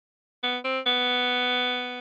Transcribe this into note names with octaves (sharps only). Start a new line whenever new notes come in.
B3
C4
B3